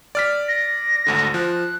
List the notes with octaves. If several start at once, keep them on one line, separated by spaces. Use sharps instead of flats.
D5 F6 B6
A#6
G#1 D2 D3
F3 F#6